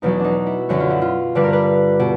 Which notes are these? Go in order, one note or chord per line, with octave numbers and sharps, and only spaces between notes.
E2 B2 F#3 D#4
D4 D#4
E4
F#2 D3 F#3 F#4
F4
E4
F4
G2 D3 G3 B4
A#4
B4
B2